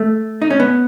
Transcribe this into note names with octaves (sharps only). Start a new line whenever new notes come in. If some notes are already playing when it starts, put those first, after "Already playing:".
Already playing: A3
D#4
C#4
B3